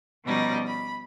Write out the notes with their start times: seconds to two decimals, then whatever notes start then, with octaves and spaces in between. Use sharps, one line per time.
0.25 B2 F3 G3 C#4 D#4 D5
0.66 B5